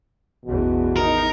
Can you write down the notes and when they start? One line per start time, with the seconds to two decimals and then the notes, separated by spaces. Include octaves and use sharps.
0.46 A1 E2 B2
0.96 D#3 D#4 A#4